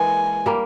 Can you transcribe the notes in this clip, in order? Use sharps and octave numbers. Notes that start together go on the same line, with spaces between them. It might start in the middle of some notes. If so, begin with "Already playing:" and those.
Already playing: E3 G#3 A#3 G#5
G3 A#3